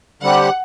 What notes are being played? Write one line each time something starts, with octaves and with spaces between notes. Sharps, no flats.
D3 G3 C4 G4 F#5